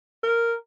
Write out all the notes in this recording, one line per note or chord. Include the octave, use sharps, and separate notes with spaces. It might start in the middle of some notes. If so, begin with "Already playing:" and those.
A#4